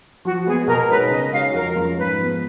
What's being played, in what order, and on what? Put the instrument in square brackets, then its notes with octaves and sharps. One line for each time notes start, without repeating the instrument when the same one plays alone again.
[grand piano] F3 [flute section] F#4
[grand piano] G#3 B3 [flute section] G#4
[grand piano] B2 [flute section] A#4
[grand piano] G#3 D#4 A#4 C#5 [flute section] B4
[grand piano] C#3 [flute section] D#5
[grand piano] G#3 D#4 F#4 C#5 [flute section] F5
[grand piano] F2 [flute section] A#4
[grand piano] F3 G#3 C#4 F4
[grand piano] G#2 [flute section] B4
[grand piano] F3 B3